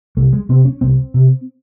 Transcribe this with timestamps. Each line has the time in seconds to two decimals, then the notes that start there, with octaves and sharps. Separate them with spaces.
0.17 C2 A3
0.33 G#3
0.49 C3 C4
0.65 C#4
0.81 C2 C4
1.14 C3